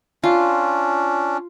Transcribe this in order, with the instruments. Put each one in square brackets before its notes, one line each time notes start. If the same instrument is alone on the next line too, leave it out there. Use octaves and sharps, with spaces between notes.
[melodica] C#4 D4 [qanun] F4